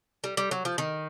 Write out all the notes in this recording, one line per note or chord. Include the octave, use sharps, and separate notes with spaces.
G3
G3
F#3
F3
D#3